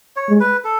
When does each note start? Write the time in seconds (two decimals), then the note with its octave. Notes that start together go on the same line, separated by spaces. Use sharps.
0.16 C#5
0.29 G#3
0.40 B4
0.64 A4